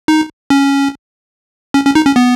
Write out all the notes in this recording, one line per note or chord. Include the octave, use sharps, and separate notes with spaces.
D#4
C#4
C#4
C#4
D#4
C#4
B3